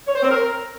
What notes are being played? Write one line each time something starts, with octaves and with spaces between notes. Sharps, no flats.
C#5
C5
C4
A#4